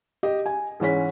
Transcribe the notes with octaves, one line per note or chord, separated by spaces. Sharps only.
G4 D#5
G#5
G#2 E3 C#4 B6